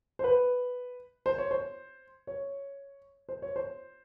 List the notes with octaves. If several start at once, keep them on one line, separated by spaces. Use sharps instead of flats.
C5
B4
C5
C#5
C5
C#5
C5
C#5
C5